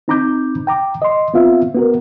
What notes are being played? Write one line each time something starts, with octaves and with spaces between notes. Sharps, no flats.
C4 D#4 A#5 B5 D6 G6
G5 A#5 D6
D#5 C6
B3 C4 F4 E5 F5
B3 F#4 A#4